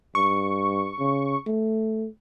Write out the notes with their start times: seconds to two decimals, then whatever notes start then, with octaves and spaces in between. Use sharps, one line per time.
0.15 G2 C#6
0.99 C#3
1.46 A3